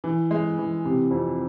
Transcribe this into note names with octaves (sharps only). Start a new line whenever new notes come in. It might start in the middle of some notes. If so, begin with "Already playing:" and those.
E3
G#3
E3
C3
F2